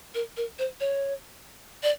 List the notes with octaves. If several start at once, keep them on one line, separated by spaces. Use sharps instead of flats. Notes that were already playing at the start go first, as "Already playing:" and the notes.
A#4
A#4
C5
C#5
D5